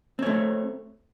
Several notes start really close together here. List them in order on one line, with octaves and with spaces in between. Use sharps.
C4 C#5 A3